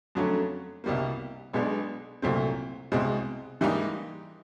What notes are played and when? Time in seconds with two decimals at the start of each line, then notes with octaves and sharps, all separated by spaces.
0.15 F2 D3 F#3 A3 C#4
0.84 C2 B2 G3 A#3
1.53 B1 B2 G#3 B3 D4
2.22 C2 A#2 F#3 A3 C4
2.92 C2 B2 G#3 C4
3.61 G#2 E3 G3 A#3 D#4